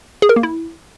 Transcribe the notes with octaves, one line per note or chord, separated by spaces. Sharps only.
G#4
A#4
A#3
E4